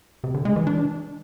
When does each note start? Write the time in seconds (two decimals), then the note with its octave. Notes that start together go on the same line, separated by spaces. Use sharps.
0.24 C3
0.34 D3
0.45 G#3
0.56 E3
0.67 D4